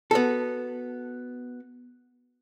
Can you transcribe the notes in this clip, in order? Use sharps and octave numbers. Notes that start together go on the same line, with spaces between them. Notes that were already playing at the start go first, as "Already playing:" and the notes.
B3 F#4 A4